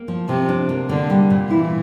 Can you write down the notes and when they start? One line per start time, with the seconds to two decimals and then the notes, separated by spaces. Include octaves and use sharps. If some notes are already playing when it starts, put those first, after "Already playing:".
Already playing: A#3
0.08 F3
0.28 C3 F3
0.49 D4
0.69 A#3
0.89 D3 A#3
1.10 G3
1.30 A#2
1.50 E3 E4